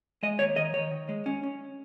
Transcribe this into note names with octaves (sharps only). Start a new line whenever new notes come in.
G#3 D#5
D#2 C#5
D#3 D#5
D#3 C#5
D#3
G#3
C#4
C#4